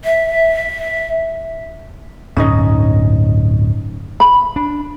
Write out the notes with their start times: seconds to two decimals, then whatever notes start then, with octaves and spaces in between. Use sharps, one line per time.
0.05 E5
2.37 D1 G2 C#4 D#4 D#5
4.20 B5
4.56 D4